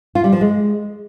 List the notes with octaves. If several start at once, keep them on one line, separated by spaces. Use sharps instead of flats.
F4
G3
F3
G#3